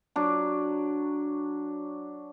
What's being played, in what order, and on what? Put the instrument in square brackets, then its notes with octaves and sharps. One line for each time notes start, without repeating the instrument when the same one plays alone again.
[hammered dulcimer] F#3 D4